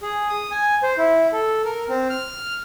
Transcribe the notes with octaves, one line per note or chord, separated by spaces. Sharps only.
G#4
D#6
G#5
C5
E4
A4
A#4
C4
F6